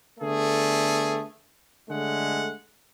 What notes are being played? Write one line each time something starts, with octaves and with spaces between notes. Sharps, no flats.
D3 A3 B3 G#4
D3 G#3 A3 F#5